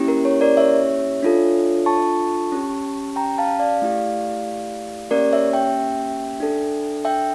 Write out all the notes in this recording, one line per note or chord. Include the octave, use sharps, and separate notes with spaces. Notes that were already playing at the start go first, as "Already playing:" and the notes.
Already playing: A#3 C#4 E4 G4
A#4
C#5
A#4 D5
C#5 E5
D4 F4 A4
A5 C#6
C#4 G4
G5 A#5
F5 A5
D5 F5
A3 E4 G4
A#3 C#4 G4 A#4 D5
C#5 E5
E5 G5
D4 A4
E5 G5